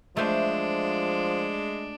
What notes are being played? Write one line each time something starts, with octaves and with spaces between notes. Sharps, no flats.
F3 G#3 A3 D4 C5